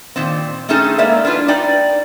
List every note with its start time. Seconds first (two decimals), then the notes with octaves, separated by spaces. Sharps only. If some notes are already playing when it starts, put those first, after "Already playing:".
0.16 A#2 D#3 C4
0.69 A3 C4 C#4 D#4 G#4 A4
0.98 G#3 A#3 B3 D5 E5
1.25 D4 E4 F4 B4
1.48 D#4 D5 G5